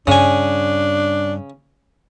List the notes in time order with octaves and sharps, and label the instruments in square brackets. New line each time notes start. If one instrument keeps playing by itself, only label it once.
[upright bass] G2 [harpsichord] C#3 G#5 [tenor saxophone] D4